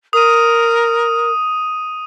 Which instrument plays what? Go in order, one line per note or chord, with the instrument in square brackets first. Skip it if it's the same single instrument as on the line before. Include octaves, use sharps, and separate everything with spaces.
[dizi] A#4 [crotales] D#6 D#7